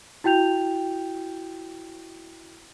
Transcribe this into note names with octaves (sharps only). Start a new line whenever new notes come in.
E4 F#4 G5 G6 F7